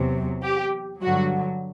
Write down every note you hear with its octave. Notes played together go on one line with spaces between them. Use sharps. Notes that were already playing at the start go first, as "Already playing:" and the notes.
Already playing: E2 C3 F#3
G4
G2 D3 F#3 F#4